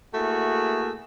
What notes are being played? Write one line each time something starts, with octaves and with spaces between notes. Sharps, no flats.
A3 A#3 E4 F#4 G#4